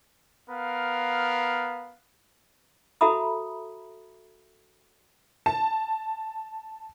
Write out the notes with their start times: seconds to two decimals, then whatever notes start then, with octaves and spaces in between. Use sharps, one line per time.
0.50 B3 A#4 F5
3.01 F#4 A4 E5 A#5 B5 D#6
5.46 A5